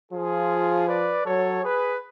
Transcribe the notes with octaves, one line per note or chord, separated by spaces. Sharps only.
F3 F4 G#4
B4 D5
F#3 A4 C#5
G#4 B4